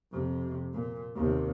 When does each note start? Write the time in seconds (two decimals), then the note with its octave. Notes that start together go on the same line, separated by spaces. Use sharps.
0.13 F2 C3
0.74 A#2
1.16 D#2 C3